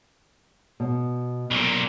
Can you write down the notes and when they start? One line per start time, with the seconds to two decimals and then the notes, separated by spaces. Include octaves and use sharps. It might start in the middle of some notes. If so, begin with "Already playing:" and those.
0.80 B2
1.51 B1 A#2